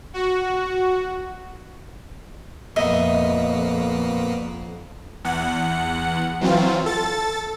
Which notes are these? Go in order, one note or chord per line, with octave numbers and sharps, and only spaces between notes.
F#4
F2 A#2 A#3 B3 D#5 E5
E2 F#5
E3 F#3 C4 F4
A4 A6